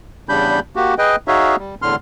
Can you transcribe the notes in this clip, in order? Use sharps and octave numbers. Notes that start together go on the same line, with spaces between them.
E2 C#3 G3 D4 B5 G6
A#3 F#4 G4
G#4 B4 D#5 G5
D#4 F#4 G#4 C#5 E5 F5
G3
E2 A2 D3 C6 F6